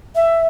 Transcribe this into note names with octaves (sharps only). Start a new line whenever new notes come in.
E5